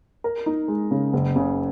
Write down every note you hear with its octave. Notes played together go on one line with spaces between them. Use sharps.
A#4
D#4
G#3
C#3
F#1
C#3